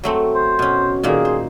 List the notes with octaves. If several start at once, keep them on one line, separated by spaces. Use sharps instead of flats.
F#3 A3 C4
C5
B2 C#4
A#2 D#3 A#3 G#4
C5